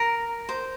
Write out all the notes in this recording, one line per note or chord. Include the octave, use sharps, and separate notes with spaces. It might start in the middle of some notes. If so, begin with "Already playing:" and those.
Already playing: A#4
C5